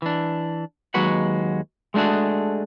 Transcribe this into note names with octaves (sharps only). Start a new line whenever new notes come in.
E3 D4
D#2 F#3 G#3 F#4 B4 F#5
G#3 A3 D4 F#4 G#4